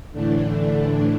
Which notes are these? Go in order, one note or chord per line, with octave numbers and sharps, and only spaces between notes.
A2 D3 E3 A3 D4
D3